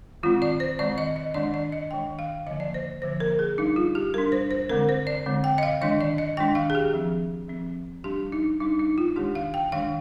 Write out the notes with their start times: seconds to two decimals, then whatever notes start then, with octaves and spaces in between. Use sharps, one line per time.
0.23 D#3 G#3 C4 F4
0.42 D5
0.60 C5
0.79 D#3 G#3 C4 D5
0.98 D#5
1.16 D#5
1.34 D#3 G#3 D4 D5
1.54 D5
1.72 D#5
1.90 D#3 G#3 D4 G5
2.19 F5
2.46 D3 F3 A#3 D#5
2.60 D5
2.74 C5
3.02 D3 F3 A#3 C5
3.20 A#4
3.39 G#4
3.58 G3 D4 D#4
3.76 F4
3.95 G4
4.14 G3 D4 A#4
4.32 C5
4.51 C5
4.69 D3 G#3 C4 A#4
4.89 C5
5.07 D5
5.26 D3 G#3 C4
5.44 G5
5.58 D#5
5.63 F5
5.81 D#3 G#3 D4 D#5
6.01 D5
6.18 D#5
6.37 D#3 G#3 D4 G5
6.55 F5
6.70 G#4
6.75 G4
6.94 F3 C4
7.49 F3 C4
8.04 G3 D4 G4
8.32 D#4
8.60 G3 D4 D#4
8.79 D#4
8.98 F4
9.16 D#3 G#3 D4 G4
9.35 F5
9.54 G5
9.72 D#3 G#3 D4 F5